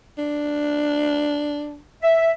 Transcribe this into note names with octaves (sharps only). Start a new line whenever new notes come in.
D4
E5